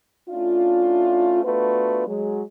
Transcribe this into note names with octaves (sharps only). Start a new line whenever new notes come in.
A3 C#4 D4 E4 F4
A3 B3 D4 F4 F#4 B4
F#3 G#3